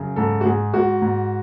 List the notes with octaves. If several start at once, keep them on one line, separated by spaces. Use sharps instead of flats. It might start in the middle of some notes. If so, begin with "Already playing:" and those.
Already playing: F#2 C#3
G#2 A4
F#4
G#2 G#4
G#2 F#4
G#2